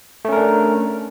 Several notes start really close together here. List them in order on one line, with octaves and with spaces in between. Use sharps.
A3 C#4 A#4 D4